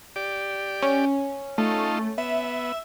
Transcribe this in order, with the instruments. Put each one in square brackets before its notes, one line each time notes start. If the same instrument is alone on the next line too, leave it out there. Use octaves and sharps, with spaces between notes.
[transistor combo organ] G4 D5
[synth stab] C#4
[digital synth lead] A3 [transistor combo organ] D#4 F4 A4
[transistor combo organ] B3 [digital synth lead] E5